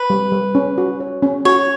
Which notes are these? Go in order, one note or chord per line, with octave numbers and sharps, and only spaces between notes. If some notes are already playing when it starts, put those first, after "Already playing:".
Already playing: B4
G3
G3
C#4
F#4
C#5
C#4
F#4 C#5